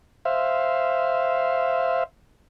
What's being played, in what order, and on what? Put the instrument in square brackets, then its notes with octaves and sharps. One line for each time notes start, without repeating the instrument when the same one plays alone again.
[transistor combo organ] C5 E5 F5